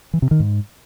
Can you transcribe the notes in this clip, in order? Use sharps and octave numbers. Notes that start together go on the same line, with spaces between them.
E3
C3
D#3
G#2